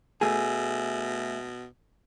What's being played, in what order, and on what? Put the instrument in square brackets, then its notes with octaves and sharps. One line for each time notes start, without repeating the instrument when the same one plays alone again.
[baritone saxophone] B2 [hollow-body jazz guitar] A3 G#4